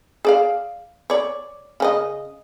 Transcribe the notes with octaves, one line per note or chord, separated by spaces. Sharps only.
G#4 D5 F5
C#5 D5
C#3 C#4 D#5